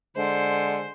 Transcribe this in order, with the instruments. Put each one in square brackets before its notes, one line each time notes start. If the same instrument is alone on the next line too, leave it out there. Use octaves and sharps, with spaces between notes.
[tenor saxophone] D3 [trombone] G#3 [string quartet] C5